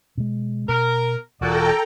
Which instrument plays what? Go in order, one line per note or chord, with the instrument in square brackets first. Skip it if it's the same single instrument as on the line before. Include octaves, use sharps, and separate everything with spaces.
[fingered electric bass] B2 G#3
[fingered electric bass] B2 [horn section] A#4
[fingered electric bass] E1 E2 [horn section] A#2 F#4 D5 [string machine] A4 G5 A#5